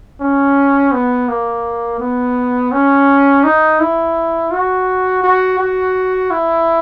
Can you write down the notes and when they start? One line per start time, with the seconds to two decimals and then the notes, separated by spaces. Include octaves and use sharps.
0.21 C#4
0.92 B3
1.29 A#3
2.00 B3
2.72 C#4
3.44 D#4
3.80 E4
4.52 F#4
5.24 F#4
5.59 F#4
6.31 E4